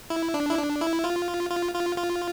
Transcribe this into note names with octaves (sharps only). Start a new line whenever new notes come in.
E4
D4
E4
D4
E4
F4
F4
F4
F4